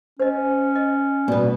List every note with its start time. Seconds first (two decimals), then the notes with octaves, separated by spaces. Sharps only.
0.20 C#4 C5 D#5
0.76 D#5
1.28 B2 G3 B3